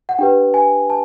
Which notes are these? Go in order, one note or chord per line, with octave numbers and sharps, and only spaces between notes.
F#5
D4 G4 B4 G5
G#5
A5